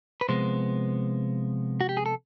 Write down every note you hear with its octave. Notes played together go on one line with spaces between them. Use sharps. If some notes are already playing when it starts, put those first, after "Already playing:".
B4
C3 F3 G#3 B3 C5
F#4
G4
G#4
A4